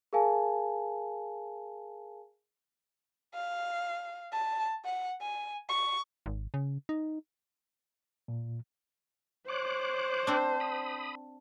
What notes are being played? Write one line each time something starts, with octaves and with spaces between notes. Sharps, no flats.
G#4 A#4 F5 G#5 A5
F5
A5
F#5
G#5
C#6
G#1
C#3
D#4
A#2
C5 C#5 D6 F#6
C4 D4
B5 D#6